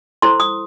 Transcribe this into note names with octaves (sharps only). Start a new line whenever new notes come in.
E4 A4 C5 C6
D#6